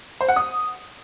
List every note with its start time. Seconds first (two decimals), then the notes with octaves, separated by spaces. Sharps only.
0.21 C5
0.28 F#5
0.36 D#6